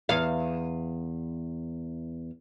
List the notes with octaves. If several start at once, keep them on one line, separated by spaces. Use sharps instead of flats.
E2 F5